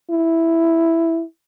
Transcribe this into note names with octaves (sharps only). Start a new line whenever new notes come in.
E4